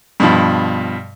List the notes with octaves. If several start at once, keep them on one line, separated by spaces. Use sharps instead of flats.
G2 B2 F3